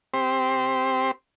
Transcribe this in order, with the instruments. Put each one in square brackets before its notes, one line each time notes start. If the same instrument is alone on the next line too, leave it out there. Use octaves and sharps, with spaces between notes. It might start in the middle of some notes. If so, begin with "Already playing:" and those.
[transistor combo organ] C4 G4 C5